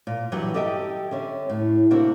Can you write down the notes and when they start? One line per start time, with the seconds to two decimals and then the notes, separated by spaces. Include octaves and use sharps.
0.07 A#2
0.32 G2 E3 F#3 G4 F#5
0.54 G4 A4 D#5 E5 G5
1.11 D3 C#4 E5
1.49 A2
1.91 C3 A#3 D4 E4 F#4